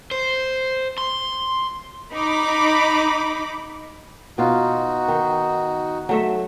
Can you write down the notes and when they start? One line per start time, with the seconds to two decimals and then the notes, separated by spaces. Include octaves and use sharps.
0.11 C5
0.98 C6
2.12 D#4 B5 D6
4.38 B2 D#4 F4 F#4
5.08 D#3
6.09 F#3 A3 E5